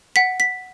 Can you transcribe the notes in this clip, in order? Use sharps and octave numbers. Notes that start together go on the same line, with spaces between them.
F#5 B6
B6